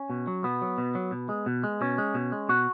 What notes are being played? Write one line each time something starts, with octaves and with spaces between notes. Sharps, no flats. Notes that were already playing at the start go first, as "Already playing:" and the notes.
Already playing: C#4
B2
F#3
B2 B3
F#3
B2
F#3
B2
G#3
B2
G#3
B2 C#4
G#3
B2
G#3
B2 F#4